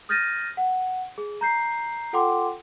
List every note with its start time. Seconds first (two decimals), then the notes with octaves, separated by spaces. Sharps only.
0.09 D#6 F6 G6 A6 A#6 D#7
0.57 F#5
1.18 G#4
1.41 A#5 G6 C7
2.13 F4 A4 F#5 G5 C6 D6